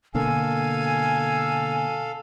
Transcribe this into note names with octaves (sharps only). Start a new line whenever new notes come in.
B2 D3 A#3 A4 F5 G#5